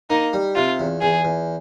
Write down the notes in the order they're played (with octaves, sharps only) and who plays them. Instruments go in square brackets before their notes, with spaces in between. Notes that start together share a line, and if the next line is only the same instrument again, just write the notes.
[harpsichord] A#3 [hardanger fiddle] D#4
[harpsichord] G3
[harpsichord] C3 [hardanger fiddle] F4
[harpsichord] E2
[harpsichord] E2 [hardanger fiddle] G#4
[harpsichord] E2